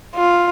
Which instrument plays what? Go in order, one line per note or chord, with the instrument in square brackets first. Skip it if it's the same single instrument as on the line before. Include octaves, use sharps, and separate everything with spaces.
[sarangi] F4